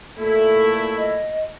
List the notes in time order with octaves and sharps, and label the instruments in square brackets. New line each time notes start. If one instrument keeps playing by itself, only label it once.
[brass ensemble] A#2 A3 E4 [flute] A4
[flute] D#5